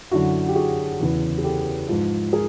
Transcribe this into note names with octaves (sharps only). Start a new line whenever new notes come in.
F#2 D3 F#3 E4 F#4
G4
F#4 G#4
E2 C#3 E3
G#4
G4 A4
G#2 F3
G#4 A#4